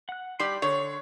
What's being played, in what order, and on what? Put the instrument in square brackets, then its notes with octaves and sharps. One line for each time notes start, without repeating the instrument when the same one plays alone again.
[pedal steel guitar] F#5 F#6
[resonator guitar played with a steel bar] G3 G4 D5 [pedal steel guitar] C6 G6
[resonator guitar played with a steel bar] D3 [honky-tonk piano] C#5